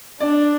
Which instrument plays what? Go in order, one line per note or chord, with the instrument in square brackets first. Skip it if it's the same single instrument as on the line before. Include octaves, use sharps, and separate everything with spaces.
[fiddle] D4 [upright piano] D5